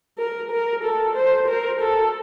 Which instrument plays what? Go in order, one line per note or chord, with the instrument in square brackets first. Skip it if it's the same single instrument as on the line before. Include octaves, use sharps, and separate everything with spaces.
[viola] A#4
A#4
A4
C5
A#4
A4